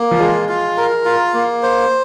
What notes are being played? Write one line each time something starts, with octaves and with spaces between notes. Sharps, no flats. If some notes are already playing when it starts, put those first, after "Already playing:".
Already playing: A#3
F3
G#3 F4
F4
A#4
F4
A#3
C5